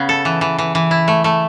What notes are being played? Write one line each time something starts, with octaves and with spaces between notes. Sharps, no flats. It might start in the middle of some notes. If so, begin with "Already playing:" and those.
Already playing: C#3 B3
A4
E3
E3
E3
E3
E4
A3
A3